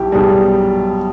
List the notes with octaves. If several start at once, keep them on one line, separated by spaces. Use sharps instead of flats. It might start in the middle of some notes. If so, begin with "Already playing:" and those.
Already playing: B1 G3 E4 G4
B1 B2 G3 G#4